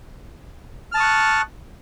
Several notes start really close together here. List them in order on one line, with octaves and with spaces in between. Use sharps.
F6 A5 D#6 C#6 F#6